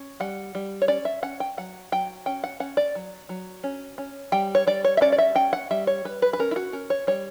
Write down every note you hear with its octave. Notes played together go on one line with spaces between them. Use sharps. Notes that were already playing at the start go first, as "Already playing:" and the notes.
Already playing: C#4
G3 F#5
G3
C#5
C#4 D5
E5
C#4 F#5
G5
F#3 F#5
F#3 G5
C#4 G5
F#5
C#4 F#5
D5
F#3
F#3
C#4
C#4
G3 G5
C#5
G3 D5
C#5
E5
C#4 D5
D5
E5
C#4 G5
F#5
G3 E5
C#5
G3 B4
B4
B4
C#4 A#4
E4
F#4
C#4 A#4
C#5
G3 C#5